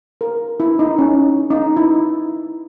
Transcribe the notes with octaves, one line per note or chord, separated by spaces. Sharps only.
A#4
E4
D#4
C#4
D#4
E4